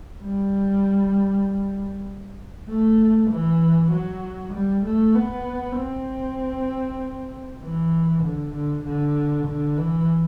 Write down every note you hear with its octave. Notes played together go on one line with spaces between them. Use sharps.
G3
A3
E3
F#3
G3
A3
B3
C4
E3
D3
D3
D3
D3
E3